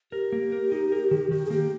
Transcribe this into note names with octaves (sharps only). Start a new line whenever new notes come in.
G4 A#4
A#3
A#4
D#4
A#4
D#3
D#3 G4
G#4
A#3 G4